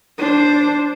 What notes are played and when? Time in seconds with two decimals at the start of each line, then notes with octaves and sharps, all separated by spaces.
0.18 D4 C5